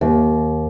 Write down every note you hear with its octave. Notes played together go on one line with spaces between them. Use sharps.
D#2